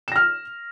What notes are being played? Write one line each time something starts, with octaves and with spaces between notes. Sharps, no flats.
F6 A#6 E7